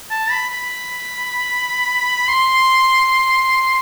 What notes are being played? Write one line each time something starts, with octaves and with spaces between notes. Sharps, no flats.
A5
B5
B5
C6